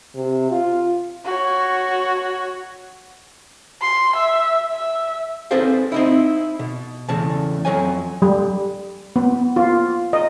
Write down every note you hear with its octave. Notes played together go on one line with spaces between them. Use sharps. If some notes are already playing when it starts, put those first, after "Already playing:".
C3
F4
F#4 C#5
C6
E5
E5
C4 G#4 A4 B4 C5 F5
C4 D#4 E4
B2
E2 A2 C#3 A5
F2 F#3 C#5 G#5
G3
B3
F4
D#5